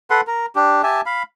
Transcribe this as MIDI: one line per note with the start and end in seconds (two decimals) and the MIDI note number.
0.10 0.21 69
0.10 0.21 71
0.10 0.21 78
0.10 0.21 84
0.27 0.46 70
0.56 0.82 62
0.56 0.82 67
0.83 1.01 67
0.83 1.01 76
0.83 1.01 80
0.83 1.01 81
1.06 1.23 77
1.06 1.23 83